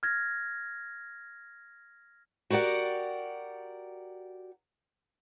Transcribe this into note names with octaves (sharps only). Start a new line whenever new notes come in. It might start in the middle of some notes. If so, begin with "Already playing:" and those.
F6 G#6 A#6
F#4 G4 A#4 D5 F#5